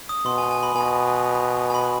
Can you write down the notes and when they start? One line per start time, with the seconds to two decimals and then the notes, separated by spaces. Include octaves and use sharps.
0.09 D#6
0.25 B2 C6
0.38 G#5
0.51 G#5
0.63 B5
0.75 B2 G#5
1.70 G#5
1.75 B5